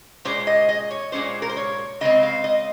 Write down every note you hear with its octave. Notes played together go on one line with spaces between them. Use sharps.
A#2 G#3 C#4 C5
D#5
D#5
C#5
A#2 G#3 C#4 C5
A#4
C5
C#5
C#3 G#3 C4 D#5
F5
D#5